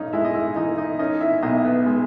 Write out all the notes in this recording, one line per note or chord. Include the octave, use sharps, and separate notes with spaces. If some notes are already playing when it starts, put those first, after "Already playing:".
Already playing: G2 C#4 D#4 D#5
G#3 E4 E5
D#5
E4 E5
E3 D#4 D#5
D#4 D#5
C#4 D#4 D#5
E4 E5
B1 D#4 D#5
B3 B4
G#3